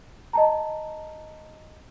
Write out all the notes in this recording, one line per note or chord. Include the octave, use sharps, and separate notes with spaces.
D#5 A5 A#5